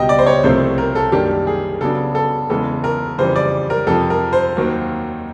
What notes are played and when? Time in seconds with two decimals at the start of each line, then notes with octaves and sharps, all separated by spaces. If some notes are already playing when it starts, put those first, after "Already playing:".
Already playing: C#2 B2 G3 D#5 G5
0.09 D5
0.19 C5
0.26 C#5
0.44 C2 C3 F3 A3 C4 C5
0.78 A#4
0.95 A4
1.12 F#2 D#3 G3 A#3 D4 G4
1.47 G#4
1.81 C#3 F#3 B3 D4 A4
2.15 A4
2.50 E2 C#3 E3 G#3 A4
2.84 A#4
3.18 F2 C#3 E3 G3 C5
3.36 D5
3.70 A#4
3.87 F2 C3 F3 A4
4.10 A#4
4.33 C5
4.56 D#2 D#3 F#3 A#3